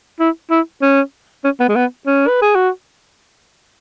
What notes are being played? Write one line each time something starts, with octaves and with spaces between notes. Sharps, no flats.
E4
E4
C#4
C#4
B3
G#3
B3
C#4
B4
G#4
F#4